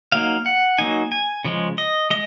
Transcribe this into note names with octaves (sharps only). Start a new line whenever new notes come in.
F#3 A#3 D#4 F5
F#5
F#3 A#3 D#4 G#5
G#5
C#3 F3 G#3
D#5
G#3 D#5